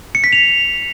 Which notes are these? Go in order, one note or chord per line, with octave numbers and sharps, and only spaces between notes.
C#7
B6
F7